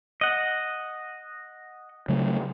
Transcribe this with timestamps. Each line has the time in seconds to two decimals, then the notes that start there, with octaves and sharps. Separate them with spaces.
0.21 D#5 F#5
2.09 C#3 F#3 A3